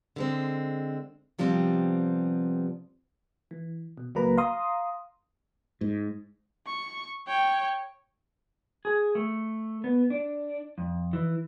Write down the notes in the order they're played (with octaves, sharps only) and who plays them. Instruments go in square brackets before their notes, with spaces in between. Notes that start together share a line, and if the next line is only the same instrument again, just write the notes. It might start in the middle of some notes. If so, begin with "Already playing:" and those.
[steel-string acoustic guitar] D3 G#3 C4
C3 F3 G3 B3 C4
[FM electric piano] E3
B2
C#2 F#3 A#3 B4 A#5 B5
F5 A#5 C6 D#6
[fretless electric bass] G#2
[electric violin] C#6
C#5 G5
[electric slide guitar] G#4
A3
B3
D4
F2
E3